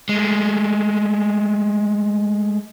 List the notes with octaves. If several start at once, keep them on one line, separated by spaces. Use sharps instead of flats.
G#3 A3